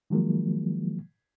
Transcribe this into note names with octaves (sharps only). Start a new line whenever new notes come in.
D#3 F3 F#3 G#3 A#3